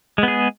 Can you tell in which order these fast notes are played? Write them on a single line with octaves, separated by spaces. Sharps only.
G#3 B3 G#4